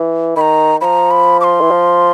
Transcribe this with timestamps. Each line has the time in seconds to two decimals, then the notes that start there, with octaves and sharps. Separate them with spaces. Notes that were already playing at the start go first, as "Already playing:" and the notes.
Already playing: E3
0.36 D#3 A#5 B5
0.81 F3 A#5 B5
1.11 B5
1.41 D6
1.44 C6
1.61 E3
1.71 F3